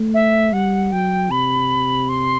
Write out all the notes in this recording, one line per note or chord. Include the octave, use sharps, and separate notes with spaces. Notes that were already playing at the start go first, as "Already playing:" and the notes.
Already playing: A3
E5
G3 F#5
F#3 G5
C3 B5
C6